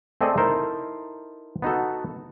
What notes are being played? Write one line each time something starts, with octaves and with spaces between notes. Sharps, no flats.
A3 C4 G#4 A4 D5 D#5
D#4 E4 A4 A#4 C5
B3 D#4 F#4 A4